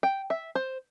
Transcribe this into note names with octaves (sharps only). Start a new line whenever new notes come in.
G5
E5
C5